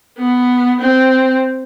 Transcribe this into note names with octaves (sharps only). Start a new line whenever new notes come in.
B3
C4